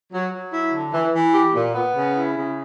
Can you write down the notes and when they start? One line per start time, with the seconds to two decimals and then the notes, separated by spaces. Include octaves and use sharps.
0.13 F#3
0.32 F#3
0.53 E4
0.73 D3
0.94 E3
1.14 E3
1.34 G4
1.54 A#2
1.75 B3
1.96 C#3
2.16 E4
2.36 C#3